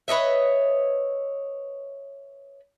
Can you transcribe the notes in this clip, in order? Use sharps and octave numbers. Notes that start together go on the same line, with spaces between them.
B4 C#5 D#5 E5